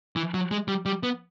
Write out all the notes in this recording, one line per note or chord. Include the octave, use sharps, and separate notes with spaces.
E3
F#3
G#3
G3
G3
B3